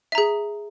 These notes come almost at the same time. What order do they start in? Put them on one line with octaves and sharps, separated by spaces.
E5 A#5 G#4